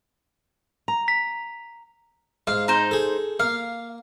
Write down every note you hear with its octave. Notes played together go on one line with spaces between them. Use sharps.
A#5
B6
G#2 F5
D#4 C5
G#4 A4
A#3 F5